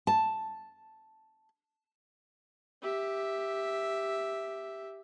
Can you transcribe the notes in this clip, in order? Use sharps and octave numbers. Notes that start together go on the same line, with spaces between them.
A5
G4 E5